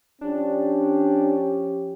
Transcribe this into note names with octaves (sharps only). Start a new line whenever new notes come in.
F3 C#4 D4 G4